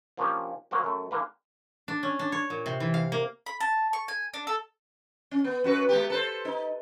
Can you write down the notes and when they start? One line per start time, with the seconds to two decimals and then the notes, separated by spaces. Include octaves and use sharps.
0.17 F3 A#3 C#4 D4 G4
0.71 F#3 A#3 C4 F#4
0.84 F#2 A3
1.11 D3 E3 A#3 B4
1.88 D4
2.03 C#4
2.19 D4
2.32 C#5
2.50 A#2
2.66 C3
2.80 E3
2.94 F5
3.12 A#3
3.46 B5
3.61 A5
3.93 C#6
4.08 G#5
4.34 D4
4.47 A4
5.31 C#4
5.44 B3
5.64 F#2 F#4 B4
5.89 G#3 B3 G4
6.10 A4 B4 C5
6.45 D#4